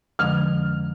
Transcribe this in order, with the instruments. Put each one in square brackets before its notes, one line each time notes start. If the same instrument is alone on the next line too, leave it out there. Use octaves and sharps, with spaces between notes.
[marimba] F2 D3 F3 G#3 C#4 [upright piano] F6